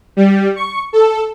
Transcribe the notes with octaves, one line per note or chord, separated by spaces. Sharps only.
G3
C#6
A4